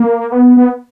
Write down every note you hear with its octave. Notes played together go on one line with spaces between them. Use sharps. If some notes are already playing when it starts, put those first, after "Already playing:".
Already playing: A#3
B3
B3